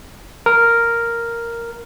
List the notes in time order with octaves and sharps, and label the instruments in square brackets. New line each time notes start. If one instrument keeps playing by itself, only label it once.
[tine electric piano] A#4